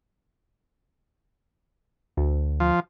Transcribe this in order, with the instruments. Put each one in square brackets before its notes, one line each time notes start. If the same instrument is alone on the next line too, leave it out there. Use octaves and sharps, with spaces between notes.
[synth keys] D2
[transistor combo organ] F3